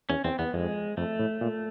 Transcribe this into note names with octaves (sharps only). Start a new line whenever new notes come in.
E2 C#4
E2 C4
E2 B3
F2 G#3
F2 A3
A2
A#2